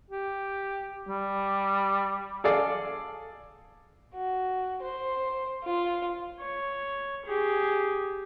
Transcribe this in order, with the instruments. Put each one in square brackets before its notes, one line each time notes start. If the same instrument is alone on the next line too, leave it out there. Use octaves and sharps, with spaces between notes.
[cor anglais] G4
G3
[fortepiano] G#4 A4 D5 F5
[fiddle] F#4
C5
F4
[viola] C#5
G4 G#4